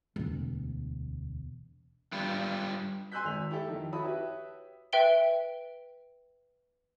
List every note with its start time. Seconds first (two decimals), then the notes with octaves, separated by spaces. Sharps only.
0.16 E1 D2
2.12 G2 G3 F4
3.12 G#5 C6 E6 F#6 G6 B6
3.24 G#1 F7
3.51 E4 G4 A4
3.68 F2 D#3
3.92 E4 F#4 C#5 A5 B5 D#6
4.04 F#4 G4 B4 C#5 E5
4.93 B4 E5 G5 D7 G7